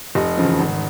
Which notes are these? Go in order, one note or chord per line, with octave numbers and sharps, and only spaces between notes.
F1 D#5
E2 C#3 F3
G#1